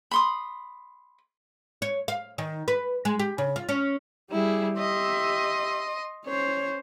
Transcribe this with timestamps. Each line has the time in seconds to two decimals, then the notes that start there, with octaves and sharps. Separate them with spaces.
0.11 B5 C6 D#6
1.82 C#5
2.08 F5
2.38 D#3
2.68 B4
3.05 G#3
3.19 G4
3.38 C#3
3.56 F4
3.69 C#4
4.31 G3 E4 G4 G#4
4.78 G4 D#5 E5 C6
6.26 C#4 C5 C#5